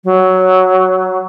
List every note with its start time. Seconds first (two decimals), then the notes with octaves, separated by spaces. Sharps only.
0.04 F#3